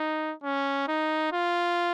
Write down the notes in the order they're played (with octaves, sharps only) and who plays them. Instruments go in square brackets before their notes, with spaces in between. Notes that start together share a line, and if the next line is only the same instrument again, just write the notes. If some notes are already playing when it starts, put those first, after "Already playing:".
Already playing: [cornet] D#4
C#4
D#4
F4